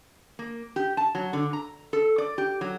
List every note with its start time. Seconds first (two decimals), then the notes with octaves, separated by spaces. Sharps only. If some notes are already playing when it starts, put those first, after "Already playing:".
0.39 A#3
0.76 G4
0.97 A5
1.15 F#3
1.33 D3
1.53 A#5
1.93 A4
2.18 D5
2.38 G4
2.61 F#3